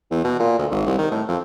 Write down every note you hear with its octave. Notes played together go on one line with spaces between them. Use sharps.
E2
B2
A#2
D2
G#1
C2
D#3
A2
F2